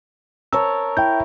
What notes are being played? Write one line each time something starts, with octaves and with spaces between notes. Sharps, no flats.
A#4 C#5 A5 E6
E4 G5 G6